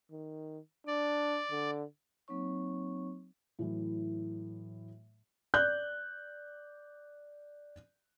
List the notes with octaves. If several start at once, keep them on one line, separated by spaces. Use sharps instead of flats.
D#3
D4 D5
D3
F#3 A#3 C4 D#4 C#5 C#6
A2 E3 F#3
D5 F#6 G6